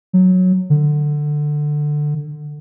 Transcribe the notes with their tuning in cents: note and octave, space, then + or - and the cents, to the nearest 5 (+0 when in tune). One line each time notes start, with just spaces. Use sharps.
F#3 -10
D3 +15